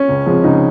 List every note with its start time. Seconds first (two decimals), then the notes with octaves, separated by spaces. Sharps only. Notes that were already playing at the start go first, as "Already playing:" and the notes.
Already playing: C#4
0.09 C#2
0.26 C3 F3 G#3
0.44 C#2 D#4